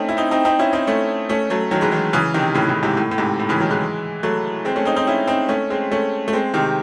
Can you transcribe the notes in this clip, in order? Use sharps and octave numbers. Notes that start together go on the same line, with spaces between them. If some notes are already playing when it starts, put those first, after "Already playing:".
Already playing: A3 C4 C#4 D#4
E4
C4 D#4
C4 D#4
C4 D#4
C#4 E4
C4 D#4
A3 C#4
A3 C#4
F#3 A3
D#3 F#3
E3 G#3
D#3 F#3
C#3 E3
C3 D#3
A2 C#3
A2 C#3
G#2 C3
A2
A2
G#2 C3
A2
C#3 E3
D#3 F#3
E3 G#3
F#3 A3
G#3 C4
A3 C#4
C4 D#4
C4 D#4
C#4 E4
C4 D#4
A3 C#4
G#3 C4
A3 C#4
A3
G#3 C4
C3 D#3